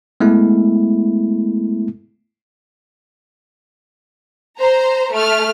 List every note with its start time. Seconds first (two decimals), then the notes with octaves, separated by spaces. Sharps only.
0.20 G#3 A3 B3 E4
4.60 C5 A#5
5.13 A3 F6